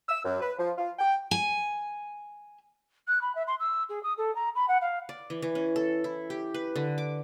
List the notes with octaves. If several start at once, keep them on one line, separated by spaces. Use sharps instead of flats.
E6
F#2
B4
F3
F4
G5
G#5
F#6
B5
E5
C6
E6
G#4
D#6
A4
A#5
B5
F#5
F5
D5
E3
E3
C#4
A4
E4
G4
B4
D3
D6